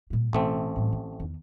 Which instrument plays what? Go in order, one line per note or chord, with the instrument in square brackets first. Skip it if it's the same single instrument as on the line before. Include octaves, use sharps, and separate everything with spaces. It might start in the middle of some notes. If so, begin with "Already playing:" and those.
[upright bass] A#2 G3
[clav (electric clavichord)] A1 A3 C4 [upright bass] B2
[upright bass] A2 G3
D#3
E2 D#3